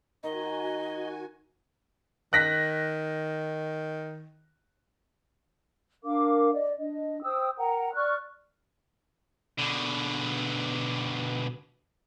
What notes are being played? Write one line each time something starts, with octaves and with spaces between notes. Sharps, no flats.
D#3 F#4 D#5 G#5
D#3 F#6 A#6 B6
D4 A#4 F5 D6
D5 D#5
D4 D#5
C5 G5 D#6 E6
A#4 F#5 G5 A#5
D5 C#6 F6 F#6
B2 D3